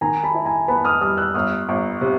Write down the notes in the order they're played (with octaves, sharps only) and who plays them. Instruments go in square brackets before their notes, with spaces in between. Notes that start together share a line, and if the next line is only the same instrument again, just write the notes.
[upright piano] D#3 [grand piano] G#5 A#5
[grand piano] A5 B5
[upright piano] E4
[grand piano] G#5 A#5
[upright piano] B3 [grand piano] A5 B5
[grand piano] D#6 F6
[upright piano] G3 [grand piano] D#6 F6
[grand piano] E6 F#6
[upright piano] G1 [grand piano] D#6 F6
[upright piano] G1
C3